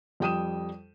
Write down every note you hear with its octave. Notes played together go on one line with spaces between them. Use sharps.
F2 G3 G5 D#6 D#7 E7